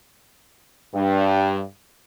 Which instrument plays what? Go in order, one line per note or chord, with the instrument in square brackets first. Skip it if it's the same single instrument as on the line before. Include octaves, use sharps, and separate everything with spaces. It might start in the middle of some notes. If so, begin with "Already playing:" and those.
[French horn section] G2